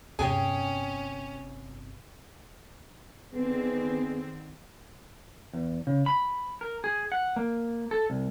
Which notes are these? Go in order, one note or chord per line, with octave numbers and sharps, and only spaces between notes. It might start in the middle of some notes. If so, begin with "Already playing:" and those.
G1 D#2 C3 C#4 G#4 G5 G#5
D3 D#3 B3 C4 G#4
E2
C#3
B5
A#4
G#4
F#5
A#3
A4
C2